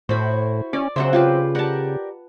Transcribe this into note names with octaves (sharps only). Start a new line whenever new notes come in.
A2 E4 F#4 C5 B5
C#4 D5
C#3 F#3 C4 C5 E5 F#5
F4 G4 B4
G4 A#4 D5 F#5 A5